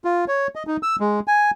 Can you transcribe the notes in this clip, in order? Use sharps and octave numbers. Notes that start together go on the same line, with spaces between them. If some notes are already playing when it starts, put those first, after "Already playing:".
F4
C#5
D#5
D#4
E6
G#3
G#5